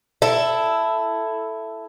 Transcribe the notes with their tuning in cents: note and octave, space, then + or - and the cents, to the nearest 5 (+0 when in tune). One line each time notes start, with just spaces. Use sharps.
E4 +10 A4 +0